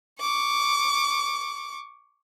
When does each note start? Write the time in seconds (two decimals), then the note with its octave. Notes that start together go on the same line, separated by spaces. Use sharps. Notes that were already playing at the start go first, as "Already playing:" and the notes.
0.20 C#6 D6